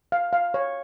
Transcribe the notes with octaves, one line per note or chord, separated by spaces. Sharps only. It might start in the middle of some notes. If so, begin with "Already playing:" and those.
F5
F5
C#5